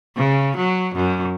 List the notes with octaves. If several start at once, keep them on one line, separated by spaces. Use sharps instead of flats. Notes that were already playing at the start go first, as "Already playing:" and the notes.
C#3
F#3
F#2